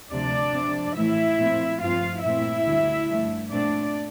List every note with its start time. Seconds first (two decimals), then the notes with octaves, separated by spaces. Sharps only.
0.12 D2 C3 F3 D4 D5
0.54 C3 F3 C4
0.97 A2 E3 A3 E4 E5
1.39 A#2 F3 A3 C4
1.81 G2 F3 A3 C4 F4 F5
2.24 A#2 A3 C4 E4 E5
2.67 D2 D3 G3
3.09 G2 D3 F3 A3
3.51 A#2 A3 C4 D4 D5